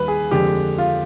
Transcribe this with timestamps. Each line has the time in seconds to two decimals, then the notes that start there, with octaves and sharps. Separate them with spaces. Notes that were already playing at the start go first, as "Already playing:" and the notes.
Already playing: D#2 D#3 G3 B4
0.08 G#4
0.31 F2 D3 G#3 G4
0.78 F4